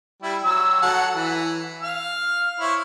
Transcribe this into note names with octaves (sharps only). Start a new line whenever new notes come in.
G3 E4
F#3 E6
F#3 A4 F#5
E3
F5 F6
E4 C5 C#5